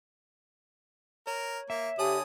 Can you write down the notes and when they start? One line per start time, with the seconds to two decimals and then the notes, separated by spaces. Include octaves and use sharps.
1.27 A#4 C#5
1.70 A#3 E5
1.99 D3 G4 C#5 G#5 A5 D#6